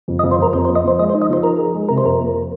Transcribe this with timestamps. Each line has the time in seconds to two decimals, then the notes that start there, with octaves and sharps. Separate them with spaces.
0.08 F2
0.19 D#5
0.23 F2
0.31 C5
0.38 F2 A#4
0.53 F2 C5
0.65 C5
0.69 A#3
0.75 D#5
0.84 F3 C5
0.99 G#3 D#5
1.09 C5
1.14 D#4
1.22 D#5
1.29 F3 C5
1.43 D#4 A#4
1.58 G#4
1.74 G#3
1.89 C3 A#4
1.98 C5
2.04 F2 A#4
2.20 A#3